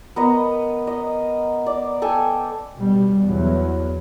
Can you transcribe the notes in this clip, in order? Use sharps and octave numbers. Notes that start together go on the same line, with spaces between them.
B3 A#4 D#5
D#5
D5
A4 G5 G#5
B2 G3
E2 F#3